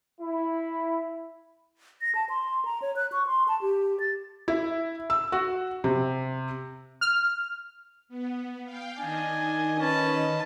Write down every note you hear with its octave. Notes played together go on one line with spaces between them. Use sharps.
E4
A#6
A5
C6
A#5
C#5
F#6
C#6
C6
A5
G4
A6
E4
E6
F#4
C3
F6
B3
F5 G5
D#3 D4 D#5 G#5
C#4 B4 A5